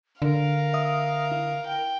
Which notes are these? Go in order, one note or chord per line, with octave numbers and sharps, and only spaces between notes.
D3 A#4 F5
E5 D#6
E4
G5